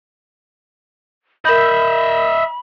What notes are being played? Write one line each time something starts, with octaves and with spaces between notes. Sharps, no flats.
A#4 D#5 E5 B5 G6